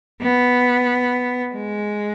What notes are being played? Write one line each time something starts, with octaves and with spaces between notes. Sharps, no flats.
B3
G#3